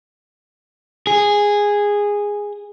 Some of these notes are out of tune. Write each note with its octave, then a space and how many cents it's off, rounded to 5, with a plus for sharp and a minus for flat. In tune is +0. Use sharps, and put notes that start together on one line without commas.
G#4 -10